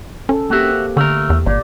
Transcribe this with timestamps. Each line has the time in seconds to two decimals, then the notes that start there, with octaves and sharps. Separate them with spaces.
0.29 C#4 A4
0.50 A#3 C4 F#4 G4 E5
0.97 D3 A3 A#4
1.30 E2
1.46 G#1 A#2 D5